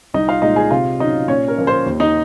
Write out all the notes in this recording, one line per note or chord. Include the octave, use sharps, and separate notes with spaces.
C2 D#4 D#5
F4 F5
A#2 G#3 D#4 D#5
G#4 G#5
C3 F4 F5
F#3 C#4 D#4 D#5
A#2 C#4 C#5
A#4
F3 A#3 C#4
C5
D#2
D#4 D#5